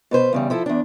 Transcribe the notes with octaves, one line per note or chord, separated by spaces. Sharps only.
B2 B4 C5
E2 C#3 G3
F3 E4 A4
E2 D4